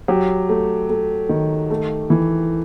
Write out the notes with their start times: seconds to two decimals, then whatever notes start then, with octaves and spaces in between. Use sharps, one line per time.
0.08 F#3 G4
0.49 A3
0.89 A3
1.29 D#3
1.70 A3
2.10 E3